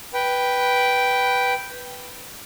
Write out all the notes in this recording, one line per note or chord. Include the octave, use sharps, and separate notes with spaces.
B4 G5